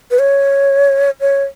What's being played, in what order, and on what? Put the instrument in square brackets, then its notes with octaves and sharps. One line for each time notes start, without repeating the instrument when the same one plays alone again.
[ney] B4
C#5
C#5